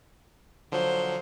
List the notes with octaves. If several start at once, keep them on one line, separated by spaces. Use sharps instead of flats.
D3 F3 F#3 C5